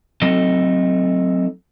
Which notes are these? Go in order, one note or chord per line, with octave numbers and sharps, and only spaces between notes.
F#3 A3 C4 D#4 A4 D#5